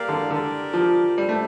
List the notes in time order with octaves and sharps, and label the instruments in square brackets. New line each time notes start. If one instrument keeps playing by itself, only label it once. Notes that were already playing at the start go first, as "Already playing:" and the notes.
Already playing: [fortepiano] A#3 [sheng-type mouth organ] G4 A#4 D5 F5
[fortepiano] D3
[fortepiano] D3 [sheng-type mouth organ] G4 A#4 D5
[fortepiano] F3
[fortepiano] G3 [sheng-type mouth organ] D4 A4 C5
[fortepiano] A3